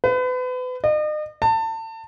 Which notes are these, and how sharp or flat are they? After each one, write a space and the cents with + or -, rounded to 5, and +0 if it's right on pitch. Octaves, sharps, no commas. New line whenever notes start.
B4 +35
D#5 -40
A5 +30